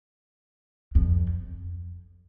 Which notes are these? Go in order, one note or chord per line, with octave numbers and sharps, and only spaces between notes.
F2